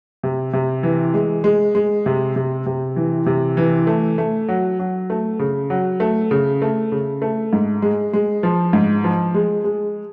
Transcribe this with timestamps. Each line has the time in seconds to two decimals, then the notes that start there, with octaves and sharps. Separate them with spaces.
0.23 C3
0.53 C3
0.83 E3
1.14 G#3
1.44 G#3
1.75 G#3
2.06 C3
2.36 C3
2.66 C3
2.96 E3
3.26 C3
3.57 E3
3.87 A3
4.18 A3
4.48 F#3
4.79 F#3
5.10 A3
5.39 C#3
5.70 F#3
6.00 A3
6.31 C#3
6.62 A3
6.92 C#3
7.22 A3
7.53 G#2
7.82 G#3
8.13 G#3
8.43 F3
8.73 G#2
9.04 F3
9.34 G#3
9.64 G#3